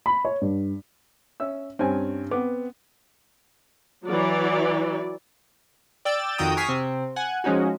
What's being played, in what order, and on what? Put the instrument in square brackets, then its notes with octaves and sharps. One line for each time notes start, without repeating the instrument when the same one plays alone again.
[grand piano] B5
C#5
G2
[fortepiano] C#4 E5 E6
[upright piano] G2 [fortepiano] C4 C#4 G#5
[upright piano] B3 C4 [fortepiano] D6
[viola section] E3 F#3 F#4 D5
[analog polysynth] D5 G5 E6 A6
F2 D#3 F#4 G5 A#5 D#6
G#5 C#6 D#6 F6 B6 C7
C3 C4
F#5 G#5
F3 G#3 C#4 D#4 F#4